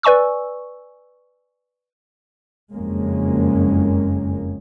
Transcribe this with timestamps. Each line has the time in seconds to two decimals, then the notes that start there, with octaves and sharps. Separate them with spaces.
0.03 B4 D5 G#5 C#6 E6
2.72 F#1 F2 G#3 A#3 C#4